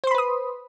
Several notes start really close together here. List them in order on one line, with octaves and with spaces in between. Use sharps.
C5 C6 B5 B4 D#6